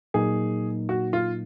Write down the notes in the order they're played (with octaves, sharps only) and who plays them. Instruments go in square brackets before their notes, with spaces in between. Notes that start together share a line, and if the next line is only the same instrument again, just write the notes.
[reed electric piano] A#2 F#3 A#3 D#4 [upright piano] G#4
[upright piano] F#4
F4